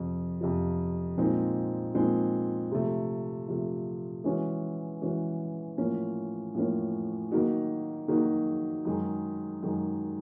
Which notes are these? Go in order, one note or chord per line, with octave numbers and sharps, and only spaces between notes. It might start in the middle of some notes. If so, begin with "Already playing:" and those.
Already playing: F2 C3 F3
F2 C3 F3
A#2 F3 G#3 C4 D#4
A#2 F3 G#3 C4 D#4
C3 F3 A3
C3 F3 A3
E3 G#3 C#4 F#4
E3 G#3 C#4 F#4
A2 F3 A#3 C#4
A2 F3 A#3 C#4
D#3 F#3 A#3 D#4 F#4
D#3 F#3 A#3 D#4 F#4
F#2 D#3 G#3
F#2 D#3 G#3